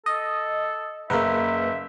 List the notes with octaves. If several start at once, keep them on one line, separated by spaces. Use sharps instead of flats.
A4 D#5
F#1 A#3 A#4 B4 E5